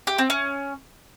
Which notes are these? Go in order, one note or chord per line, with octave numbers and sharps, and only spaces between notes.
G4
C4
C#4